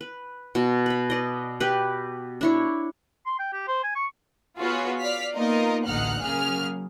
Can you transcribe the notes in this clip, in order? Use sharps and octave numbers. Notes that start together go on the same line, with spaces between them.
B4
B2
B4 B5
B4 D5 D#5
G4 B4
D4 E4 C#5
C6
G5
G4
C5
G#5
C#6
B3 F4 F#4 G#4 B4 C#5
D5 F5 F6 B6
A#3 B3 D#4 F4 A#4 D#5
A1 D2 D#4 F#5 F6 F#6
C#3 F#3 A#3 G#4 F6